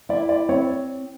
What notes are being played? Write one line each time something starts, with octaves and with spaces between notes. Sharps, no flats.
E4 D5
D5
C4 C#5